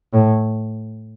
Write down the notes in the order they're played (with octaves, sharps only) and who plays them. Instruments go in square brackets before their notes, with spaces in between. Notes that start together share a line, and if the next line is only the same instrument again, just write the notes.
[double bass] A2